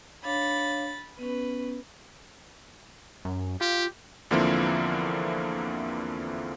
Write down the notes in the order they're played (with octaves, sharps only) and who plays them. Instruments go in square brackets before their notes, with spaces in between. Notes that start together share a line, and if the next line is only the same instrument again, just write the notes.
[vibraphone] D4 C#5 F5 [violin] B5 A6
[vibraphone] B3 C#4 [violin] B4
[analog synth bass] F#2
[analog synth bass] F4 [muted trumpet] G4
[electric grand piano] E2 D3 F3 A#3 C4 E4